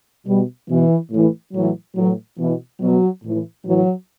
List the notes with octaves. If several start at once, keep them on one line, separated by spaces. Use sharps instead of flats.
B2 G3
B2 E3
A2 E3
A2 E3 F#3
A2 E3 F#3
B2 E3
B2 F#3
A2 E3
A2 E3 F#3